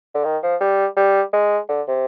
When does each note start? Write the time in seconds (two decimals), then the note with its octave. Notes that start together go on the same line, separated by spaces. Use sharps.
0.15 D3
0.25 D#3
0.43 F3
0.61 G3
0.97 G3
1.33 G#3
1.69 D3
1.87 C3